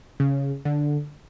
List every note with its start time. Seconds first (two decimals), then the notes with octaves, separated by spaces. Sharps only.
0.20 C#3
0.65 D3